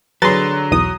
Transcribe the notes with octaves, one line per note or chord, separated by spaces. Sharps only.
D3 F#3 G#4 B4 C6 A6
B1 E2 D#6